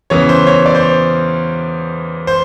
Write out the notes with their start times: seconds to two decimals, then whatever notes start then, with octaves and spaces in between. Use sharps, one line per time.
0.10 E2 C#3 E3 C#5
0.29 C5
0.47 C#5
0.66 D5
0.75 C5
0.83 C#5
2.27 C5